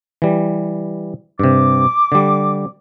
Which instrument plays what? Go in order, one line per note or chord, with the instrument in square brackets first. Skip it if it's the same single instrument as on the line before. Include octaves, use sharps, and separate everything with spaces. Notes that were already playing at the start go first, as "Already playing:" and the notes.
[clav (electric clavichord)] E3 G3
[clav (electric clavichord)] G2 C3 [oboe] D6
[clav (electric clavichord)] D3 G3